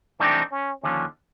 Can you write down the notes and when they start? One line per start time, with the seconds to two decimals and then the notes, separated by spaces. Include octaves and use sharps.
0.20 E3 A3 C4 D4 D#4 G4
0.51 C#4
0.83 D#2 D3 F3 C#4